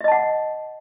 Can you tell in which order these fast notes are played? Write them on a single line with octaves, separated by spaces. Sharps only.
E5 D#5 A5 F#5